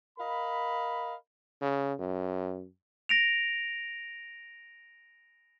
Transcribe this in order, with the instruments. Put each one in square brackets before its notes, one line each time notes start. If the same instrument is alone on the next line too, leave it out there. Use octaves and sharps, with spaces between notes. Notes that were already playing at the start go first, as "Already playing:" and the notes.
[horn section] A#4 D#5 F5 B5
[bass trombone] C#3
F#2
[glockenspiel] A#6 D7 F7